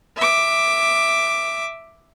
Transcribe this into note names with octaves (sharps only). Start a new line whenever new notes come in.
E5 D6